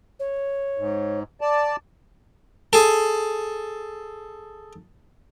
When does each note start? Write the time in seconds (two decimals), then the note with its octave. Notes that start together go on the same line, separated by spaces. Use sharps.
0.20 C#5
0.78 G#2
1.41 D5 A5
2.73 G#4 A4